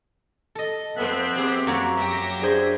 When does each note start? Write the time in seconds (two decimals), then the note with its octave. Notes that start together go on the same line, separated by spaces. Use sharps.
0.55 A4 D#5
0.97 F2 B3 C4 E5 F#6
1.35 G4 G#4
1.67 F#2 A#3 F#4 C#5
1.96 F#3 G4 E5 A#6
2.42 D4 G#4 C5